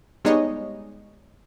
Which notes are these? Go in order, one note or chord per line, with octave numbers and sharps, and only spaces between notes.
G3 G#3 B3 D#4 C#5 D#5